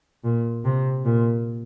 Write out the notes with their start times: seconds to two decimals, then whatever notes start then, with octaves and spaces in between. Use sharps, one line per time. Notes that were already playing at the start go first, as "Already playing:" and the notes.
0.24 A#2
0.65 C3
1.05 A#2